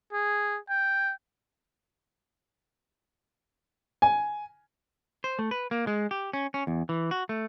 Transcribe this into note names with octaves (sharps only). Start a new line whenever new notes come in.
G#4
G5
G#5
C5
A3
B4
A#3
G#3
G4
C#4
C#4
E2
E3
F#4
A3